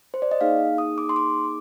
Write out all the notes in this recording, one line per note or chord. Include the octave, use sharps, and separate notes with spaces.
C5
D5
D#5
A#3 D#4 G#4 F5
D#6
D6
C6
D6